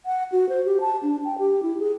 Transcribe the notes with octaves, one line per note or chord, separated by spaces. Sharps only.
F#5
F#4
C5
G4
A5
D4
G5
G4
E4
G#4